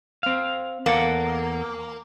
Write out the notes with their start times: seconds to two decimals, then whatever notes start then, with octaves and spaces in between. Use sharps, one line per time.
0.23 C4 F5
0.86 E2 A#3 A4 F#5